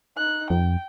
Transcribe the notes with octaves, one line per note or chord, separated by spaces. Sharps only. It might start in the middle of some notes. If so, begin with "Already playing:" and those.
D#4 F#6
F2 G5